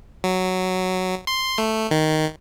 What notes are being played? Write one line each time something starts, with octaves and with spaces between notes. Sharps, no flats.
F#3
C6
A3
D#3